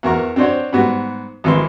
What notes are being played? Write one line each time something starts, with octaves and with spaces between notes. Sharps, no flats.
E2 F#4 A#4 C#6
C4 D4 F#4 C5 C#5
G#2 G3 B3 F#4
G#1 E3 C6